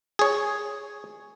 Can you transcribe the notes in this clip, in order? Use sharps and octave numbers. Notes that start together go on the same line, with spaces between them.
G#4 C#5